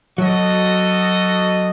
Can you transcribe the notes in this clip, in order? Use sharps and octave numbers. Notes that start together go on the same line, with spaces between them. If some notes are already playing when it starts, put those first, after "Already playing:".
F#3 F#4 A4 D#5